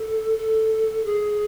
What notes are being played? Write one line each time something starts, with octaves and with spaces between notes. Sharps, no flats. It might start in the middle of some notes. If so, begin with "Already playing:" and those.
Already playing: A4
A4
G#4